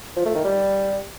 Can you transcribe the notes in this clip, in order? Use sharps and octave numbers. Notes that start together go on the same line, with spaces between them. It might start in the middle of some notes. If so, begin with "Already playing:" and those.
F3
A3
D#3
G3